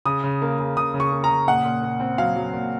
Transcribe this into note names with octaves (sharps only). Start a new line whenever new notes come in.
C#3 D#6
C#3
A#3
C#3
C#3 D#6
C#3
C#6
A#3
A#5
C#3
A#2 F#5
A#2
A#2
C4
F#3 F5
F#3
A#2